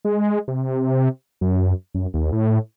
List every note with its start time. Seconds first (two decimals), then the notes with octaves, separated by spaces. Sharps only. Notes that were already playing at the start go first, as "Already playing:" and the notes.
0.05 G#3
0.48 C3
1.41 F#2
1.94 F#2
2.14 D#2
2.32 A2